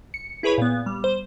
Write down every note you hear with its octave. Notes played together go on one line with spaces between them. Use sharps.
C#7
E4 G#4 B4 C#5 B5
A#2 B3
G3
C5